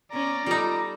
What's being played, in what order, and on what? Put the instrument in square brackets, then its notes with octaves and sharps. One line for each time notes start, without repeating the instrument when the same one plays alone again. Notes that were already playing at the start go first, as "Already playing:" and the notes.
[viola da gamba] B3 C#4 [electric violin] D5 A#5
[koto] G3 D#4 [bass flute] F4 [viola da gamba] A4